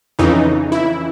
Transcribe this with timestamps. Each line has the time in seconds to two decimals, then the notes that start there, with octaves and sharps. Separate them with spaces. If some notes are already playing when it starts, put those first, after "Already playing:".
0.19 F2 C#3 E3 D#4
0.72 E4